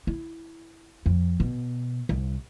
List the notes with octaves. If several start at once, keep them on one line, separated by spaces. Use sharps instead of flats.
E4
F2
B2
C2